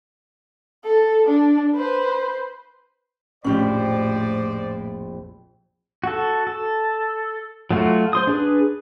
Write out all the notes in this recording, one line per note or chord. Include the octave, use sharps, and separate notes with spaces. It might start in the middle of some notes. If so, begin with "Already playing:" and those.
A4
D4
B4 C5
F1 A#1 F2 A2 C#4 G4 C5 D5
F#4 A4
A4
F#3 A3 F4 F#4
C5 C6 D#6
D4 G#4 B4